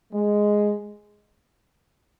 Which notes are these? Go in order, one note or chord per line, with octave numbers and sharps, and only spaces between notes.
G#3